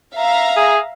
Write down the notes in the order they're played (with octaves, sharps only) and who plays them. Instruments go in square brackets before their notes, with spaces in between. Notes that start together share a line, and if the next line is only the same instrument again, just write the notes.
[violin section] E5 F5 A#5
[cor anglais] G#4